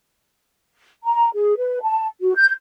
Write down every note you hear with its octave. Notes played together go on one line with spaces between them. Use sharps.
A#5
G#4
B4
A5
F#4
G6